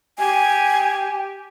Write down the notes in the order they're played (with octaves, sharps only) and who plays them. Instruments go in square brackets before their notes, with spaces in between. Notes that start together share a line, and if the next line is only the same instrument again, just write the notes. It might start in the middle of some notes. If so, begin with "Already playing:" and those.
[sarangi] G4 [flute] G#5